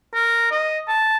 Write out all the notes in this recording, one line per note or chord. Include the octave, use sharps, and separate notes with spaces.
A#4
D#5
A5